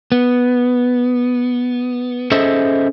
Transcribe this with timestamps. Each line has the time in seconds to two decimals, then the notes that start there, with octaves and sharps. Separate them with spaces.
0.12 B3
2.32 C#4 G#4 A4 C5 D#5 E5